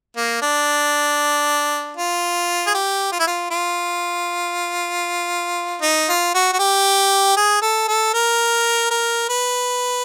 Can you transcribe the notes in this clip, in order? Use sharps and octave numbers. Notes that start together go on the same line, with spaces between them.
A#3
D4
F4
G#4
G4
F4
E4
F4
F4
D#4
F4
F#4
F#4
G4
G#4
A4
A4
A#4
A#4
B4